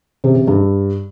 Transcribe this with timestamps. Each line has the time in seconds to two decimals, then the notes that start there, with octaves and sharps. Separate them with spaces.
0.24 C3
0.36 C3
0.47 G2